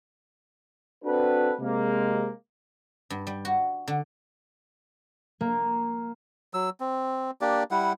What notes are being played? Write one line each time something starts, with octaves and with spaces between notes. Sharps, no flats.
C4 D4 F#4 A4 B4
C3 G#3 A#3
G2
G3
F#4
D3
A#3
F#3 E6
C4
A#3 D4 G4 D5
G3 E4 F#5